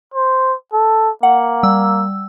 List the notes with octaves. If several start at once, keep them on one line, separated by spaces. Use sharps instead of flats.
C5
A4
A#3 F#5
G3 E6